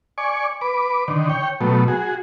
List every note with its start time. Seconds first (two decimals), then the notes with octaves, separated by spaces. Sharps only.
0.18 D5 G#5 C#6
0.61 B4 D6
1.08 D3 D#3
1.30 C#5 G5
1.61 B2 F#3 A3
1.88 F#4 G#4